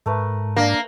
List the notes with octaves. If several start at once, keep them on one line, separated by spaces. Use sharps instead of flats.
G#2 A3 A#4 B4
A#3 D4